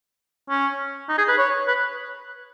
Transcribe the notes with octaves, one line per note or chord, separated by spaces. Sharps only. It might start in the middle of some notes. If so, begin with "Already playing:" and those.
C#4
D#4
G#4
B4
C#5
B4